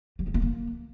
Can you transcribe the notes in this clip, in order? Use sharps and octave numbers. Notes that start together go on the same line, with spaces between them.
G3
G#3
A3
A#3